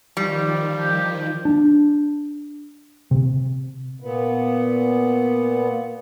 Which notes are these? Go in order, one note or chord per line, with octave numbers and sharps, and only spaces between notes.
D#3 F3 G3
G4
D4
C3
A#2 B3